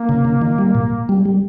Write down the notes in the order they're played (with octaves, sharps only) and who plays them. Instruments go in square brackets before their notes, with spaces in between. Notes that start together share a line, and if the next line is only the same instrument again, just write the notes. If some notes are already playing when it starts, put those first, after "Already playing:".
Already playing: [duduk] A#3
[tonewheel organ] C#3
C#3
D#3
G3
A#2
G3
G3